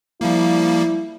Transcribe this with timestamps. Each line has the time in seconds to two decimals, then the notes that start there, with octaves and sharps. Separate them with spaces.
0.21 F3 G3 A#3 E4